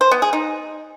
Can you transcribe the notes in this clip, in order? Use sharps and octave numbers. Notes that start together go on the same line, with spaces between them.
C5
B3
G#4
D#4